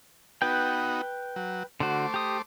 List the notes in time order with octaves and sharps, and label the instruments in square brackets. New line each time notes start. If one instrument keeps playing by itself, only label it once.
[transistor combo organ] B3 D#4 F#4 [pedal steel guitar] B4 G5
[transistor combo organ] F#3
[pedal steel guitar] D3 F#4 [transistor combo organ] A3 C5 D6
[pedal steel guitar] G4 D#6